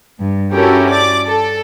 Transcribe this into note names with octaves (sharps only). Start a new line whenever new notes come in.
G2
C#4 E4 F#4 G4 A4 A#4
D5 D6
A4